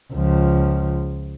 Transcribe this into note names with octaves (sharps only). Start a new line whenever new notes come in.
C#2 F3